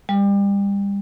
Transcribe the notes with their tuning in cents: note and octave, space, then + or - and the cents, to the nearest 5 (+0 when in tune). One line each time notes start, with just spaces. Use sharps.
G3 +30